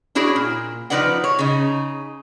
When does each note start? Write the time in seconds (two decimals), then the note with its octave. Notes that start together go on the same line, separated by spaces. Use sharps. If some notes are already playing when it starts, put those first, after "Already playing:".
0.15 D4 E4 F#4 G#4 C#5
0.36 A#2
0.90 F3 A#3 D#4 B4 D5 F#5
1.24 C#5
1.39 C#3 D#4